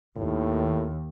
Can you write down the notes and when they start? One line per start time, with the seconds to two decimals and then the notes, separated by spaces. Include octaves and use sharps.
0.17 D#2 A2